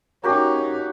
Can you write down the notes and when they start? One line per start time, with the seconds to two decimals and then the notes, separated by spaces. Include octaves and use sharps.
0.23 A#3 C#4 D#4 F#4 G4